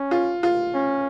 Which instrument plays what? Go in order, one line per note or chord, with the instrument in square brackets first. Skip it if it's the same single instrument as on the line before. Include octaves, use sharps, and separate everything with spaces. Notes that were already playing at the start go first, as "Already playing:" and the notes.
Already playing: [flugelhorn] C#4
[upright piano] F4
F4
[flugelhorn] C#4